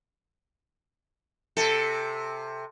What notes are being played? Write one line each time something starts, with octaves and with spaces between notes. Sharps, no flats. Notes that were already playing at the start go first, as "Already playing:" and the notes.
C3 A4